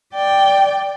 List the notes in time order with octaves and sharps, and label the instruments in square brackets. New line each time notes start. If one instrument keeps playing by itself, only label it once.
[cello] D5 G5